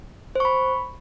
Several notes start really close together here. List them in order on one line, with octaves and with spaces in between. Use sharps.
C5 C#6 B5